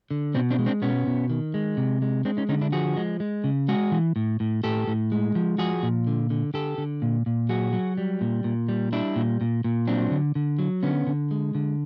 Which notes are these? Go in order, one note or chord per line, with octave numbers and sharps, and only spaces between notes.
D3
B2 C4 D4
C4 D4
G#3
C4 D4
B2 B3 C#4
B2
D#3
G#3
C3
G#3
G#3 C4 D4
C#4 D#4
D3 C#4 D#4
D4 E4
F3 F#4 G#4
G#3
G#3
C#3
G#3 F#4 G#4
E3
A2
A2
A2 G4 A4
A2
G#3
F3
F3 F#4 G#4
A#2
D3
D3
D3 G4 A4
D3
A#2
A#2
F#3 F#4 G#4
F#3
G3
A#2
A#2
G3
G3 D4 E4
A#2
A#2
A#2
F#3 C4 D4
D3
D3
F#3
D3 B3 C#4
D3
G#3
D3